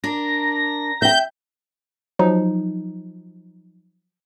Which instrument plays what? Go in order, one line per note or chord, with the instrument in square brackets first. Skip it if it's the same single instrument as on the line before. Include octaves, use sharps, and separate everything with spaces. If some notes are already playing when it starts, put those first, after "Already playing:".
[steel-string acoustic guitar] D4 A#4 [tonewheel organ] A#5 A#6
[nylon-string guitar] E5 G5 [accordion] G6
[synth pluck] F3 F#3 D#4